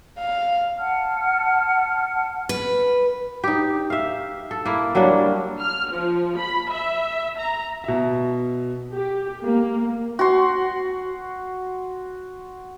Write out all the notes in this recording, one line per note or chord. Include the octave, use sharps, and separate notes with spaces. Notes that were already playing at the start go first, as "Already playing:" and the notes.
F5
F#5 A5 F6
B4
D#4 G4
E5 F5
A4
A#3 E4
F#3 G3 A#3 D4
F6
F3
B5
E5
A#5
B2 E5
G4
A#3
F#4 C6